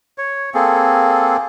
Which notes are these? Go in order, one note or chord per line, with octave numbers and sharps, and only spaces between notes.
C#5
A#3 C4 G#4 A4